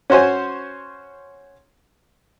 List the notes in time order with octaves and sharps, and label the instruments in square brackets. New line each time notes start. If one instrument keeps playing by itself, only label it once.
[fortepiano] C#4 F#4 C5 C#5 G#5